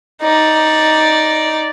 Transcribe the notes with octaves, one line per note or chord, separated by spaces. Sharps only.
D#4 D5